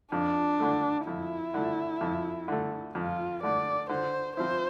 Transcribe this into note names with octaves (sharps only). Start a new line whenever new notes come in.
F2 D4
D3 A3
F2 E4
D3 A3
F2
D3 A3
F2 F4
D3 A3 D5
D3 C5
F3 C4 E4 C5